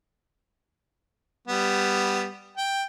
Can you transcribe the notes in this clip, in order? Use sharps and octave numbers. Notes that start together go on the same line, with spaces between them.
G3 B3
G5